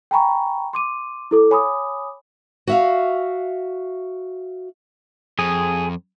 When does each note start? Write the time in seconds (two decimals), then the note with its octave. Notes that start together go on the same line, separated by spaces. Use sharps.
0.11 G5 G#5 A#5 B5 C#6
0.73 C6 D6 D#7
1.31 E4 A4 D6
1.51 C#5 G#5 B5 D6 D#6
2.67 F#4 E5 F5
5.39 F2 G#4